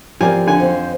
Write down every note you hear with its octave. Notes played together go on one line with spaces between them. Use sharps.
F3 C4 G4 A#4 D5 G#5
D3 G#5
F2 C5